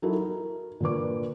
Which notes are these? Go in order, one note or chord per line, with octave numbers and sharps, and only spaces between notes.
F#3 D#4 E4 A4
A#4
A#2 D3 B4 D6